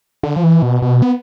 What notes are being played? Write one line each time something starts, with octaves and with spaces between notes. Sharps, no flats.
D3
F3
E3
B2
B2
B3